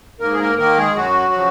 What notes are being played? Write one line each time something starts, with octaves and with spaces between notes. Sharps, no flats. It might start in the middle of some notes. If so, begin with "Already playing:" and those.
G#2 A#3 A#4
G#4
A#3 A#4
D#3 A#3 A#4
G#3 G#4
F#2 F#3 F#4
C#3 F3